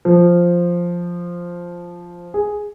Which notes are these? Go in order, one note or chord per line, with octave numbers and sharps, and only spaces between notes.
F3
G#4